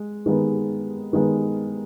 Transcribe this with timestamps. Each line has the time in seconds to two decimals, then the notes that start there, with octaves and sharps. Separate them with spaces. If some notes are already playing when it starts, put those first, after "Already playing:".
Already playing: G#3
0.26 D#3 G#3 B3
1.13 D#3 G#3 B3